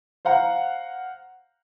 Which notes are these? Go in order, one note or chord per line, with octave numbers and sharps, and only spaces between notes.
C5 F5 F#5 A#5